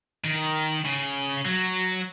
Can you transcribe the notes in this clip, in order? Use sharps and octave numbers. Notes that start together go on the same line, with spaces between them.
D#3
C#3
F#3